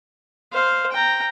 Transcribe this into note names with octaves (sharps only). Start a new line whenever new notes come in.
C5 F5
G5 A#5